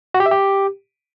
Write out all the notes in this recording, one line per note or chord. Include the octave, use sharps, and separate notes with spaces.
F#4
G4
E5
G4